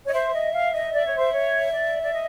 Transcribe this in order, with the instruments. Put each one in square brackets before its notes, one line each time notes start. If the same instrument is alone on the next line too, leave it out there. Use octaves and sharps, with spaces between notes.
[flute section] C#5
[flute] D#5
[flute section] C5 [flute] E5
[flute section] D#5
F5
D#5
D5
C#5
C5
C#5
D5
D5
D#5